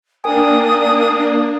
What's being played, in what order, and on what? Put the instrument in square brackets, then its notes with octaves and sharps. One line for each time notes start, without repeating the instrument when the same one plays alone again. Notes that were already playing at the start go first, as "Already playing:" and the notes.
[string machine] A#3 D4 [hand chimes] A#4 G5 G#5 [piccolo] D#6